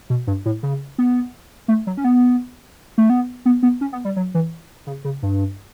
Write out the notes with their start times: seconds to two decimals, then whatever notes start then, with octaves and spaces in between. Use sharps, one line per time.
0.10 B2
0.27 G2
0.45 A2
0.63 C#3
0.98 B3
1.68 A3
1.87 F#3
1.97 C#4
2.04 B3
2.98 A3
3.10 B3
3.46 B3
3.63 B3
3.81 C#4
3.93 B3
4.05 G3
4.16 F#3
4.34 E3
4.87 C#3
5.04 C#3
5.23 G2